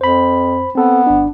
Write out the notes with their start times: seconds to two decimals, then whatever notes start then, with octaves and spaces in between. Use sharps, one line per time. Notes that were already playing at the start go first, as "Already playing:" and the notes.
0.01 F2 C5 B5
0.75 B3 C4 A4
1.07 G1 D4